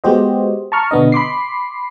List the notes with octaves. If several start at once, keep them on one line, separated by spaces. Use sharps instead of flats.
G#3 B3 F#4 G4 C5 D#5
A5 A#5 C#6 F6
B2 D3 B3 D4 D#5
B5 C6 D6 C7